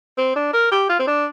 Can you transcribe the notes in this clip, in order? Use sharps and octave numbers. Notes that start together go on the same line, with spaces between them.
C4
D4
A#4
G4
F4
C4
D4